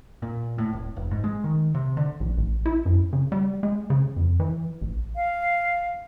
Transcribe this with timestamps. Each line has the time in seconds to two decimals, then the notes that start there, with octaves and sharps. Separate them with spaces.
0.22 A#2
0.58 A2
0.73 D1
0.96 F1
1.11 G#2
1.24 G#3
1.44 D#3
1.75 C3
1.97 D3
2.20 A#1
2.38 A1
2.66 E4
2.86 F#2
3.13 C#3
3.32 G3
3.63 G#3
3.90 C#3
4.16 F2
4.40 E3
4.82 A1
5.16 F5